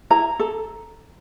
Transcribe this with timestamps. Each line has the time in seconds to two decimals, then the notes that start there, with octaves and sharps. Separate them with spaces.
0.10 E4 A#5
0.39 A4